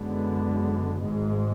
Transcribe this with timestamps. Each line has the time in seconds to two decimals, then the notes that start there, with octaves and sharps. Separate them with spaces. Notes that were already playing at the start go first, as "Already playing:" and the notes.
Already playing: F#2 D3 G#3 B3
1.01 G#1 G#2 G#3